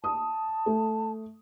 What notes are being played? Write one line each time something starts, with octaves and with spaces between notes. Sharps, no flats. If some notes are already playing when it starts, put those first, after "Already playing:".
A5 D#6
A3